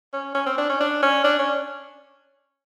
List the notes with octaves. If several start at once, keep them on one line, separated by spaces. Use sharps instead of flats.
C#4
C#4
C4
D4
C#4
D4
C#4
D4
C#4